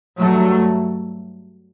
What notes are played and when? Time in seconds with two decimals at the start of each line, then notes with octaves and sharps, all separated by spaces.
0.19 G2 F#3 A3